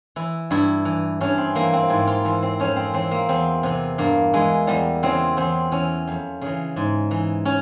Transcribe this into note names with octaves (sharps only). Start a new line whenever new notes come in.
E3 E4
G2 E4
E3
G2 C#4
C4
E3 A#3
C4
G#2 E4
F4
E3 E4
C4
F2 C#4
C4
E3 C4
A#3
E2 C4
C3 E3
G2 A#3
E3 G#3
E2 G3
C#3 E3 C4
E2 C4
E3 C#4
F2
C#3 E3
G#2
E3
C#4